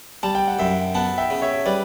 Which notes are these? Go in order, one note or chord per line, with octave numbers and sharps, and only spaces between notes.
G3 A5
G5
F#5
F#2 E5 G5
B3 F#5 A5
E5 G5
C#3
C#5 E5
G3 B4 D5